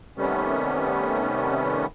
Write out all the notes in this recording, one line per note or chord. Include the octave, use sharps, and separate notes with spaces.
C3 D#3 G3 A3 B3 C#4